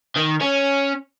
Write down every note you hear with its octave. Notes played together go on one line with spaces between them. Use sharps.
D#3
C#4